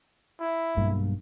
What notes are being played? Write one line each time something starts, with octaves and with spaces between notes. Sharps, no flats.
E4
B1 G2 A#3